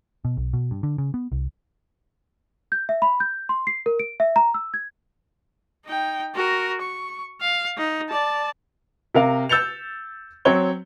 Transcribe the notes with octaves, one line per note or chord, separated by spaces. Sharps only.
B2
B1
B2
G2
D3
C#3
B3
C2
G6
E5
B5
G6
C6
C7
A#4
D7
E5
A#5
E6
G#6
D#4 G5
F#4 A#4
C#6
F5
D#4
D5 A5
C3 A#4 F5
E6 G6 A6 C#7 F7
F#3 C4 C#5 G7